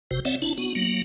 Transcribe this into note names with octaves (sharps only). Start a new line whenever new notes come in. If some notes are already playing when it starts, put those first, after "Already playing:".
G1 C3 F#4 C5
C4 C#5 D5 E5 F#5
D4 E4 A5
B3 F#4
F#3 A#3